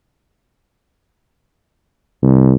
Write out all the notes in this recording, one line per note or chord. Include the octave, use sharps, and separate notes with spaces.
C2